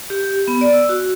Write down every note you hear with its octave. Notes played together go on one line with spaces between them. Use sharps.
G4
B3
D5
E6
F#4